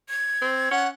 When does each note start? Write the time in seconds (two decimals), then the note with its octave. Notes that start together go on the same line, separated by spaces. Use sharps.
0.09 G#6
0.42 C4
0.71 C#4 F#5